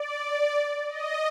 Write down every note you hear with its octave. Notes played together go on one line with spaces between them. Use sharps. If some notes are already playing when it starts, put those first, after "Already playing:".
Already playing: D5
D5
D#5